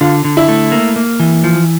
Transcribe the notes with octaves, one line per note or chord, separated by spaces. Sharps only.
D3 F4
D3
E4
A3
A#3
A#3
E3
F3